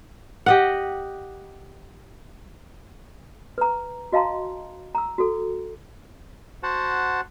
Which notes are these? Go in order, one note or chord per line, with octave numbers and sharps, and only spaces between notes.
G4 D#5 F#5
B4 A#5
F#4 D#5 F5 A5 A#5 C6
A#5 E6
F#4 A4
F#4 C5 F#5 A5